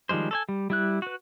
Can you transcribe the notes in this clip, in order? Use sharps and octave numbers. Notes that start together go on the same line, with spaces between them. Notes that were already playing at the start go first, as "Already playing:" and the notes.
D#3 F3 G3 G#3 C5
A4 C#5 G#5
G3
G3 E4 F#6
F#4 B4